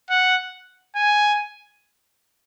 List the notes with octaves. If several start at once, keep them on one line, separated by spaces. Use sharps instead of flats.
F#5
G#5